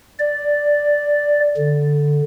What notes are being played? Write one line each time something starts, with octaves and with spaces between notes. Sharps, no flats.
D5
D3